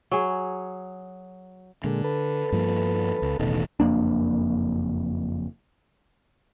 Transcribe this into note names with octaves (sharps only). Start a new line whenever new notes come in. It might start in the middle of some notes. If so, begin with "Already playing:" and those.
F#3 G#4
A#2 D3 G#3
A4 B4
G2 F3 A#3
C#2
E1 A1 B2 D#3 A4
F#1 F2 A#3 D4